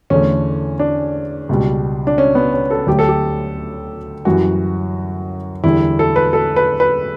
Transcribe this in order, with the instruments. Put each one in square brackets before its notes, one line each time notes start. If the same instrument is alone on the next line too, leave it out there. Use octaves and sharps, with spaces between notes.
[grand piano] E2 D3 A3 C#4
D4
C#2 B2 G3
D4
C#4
B3
C#4
A4
D2 D3 F#3 A3 G4
A4
G4
F#2 E3 G3 F#4
E2 D3 G3 E4
A4
B4
A4
B4
B4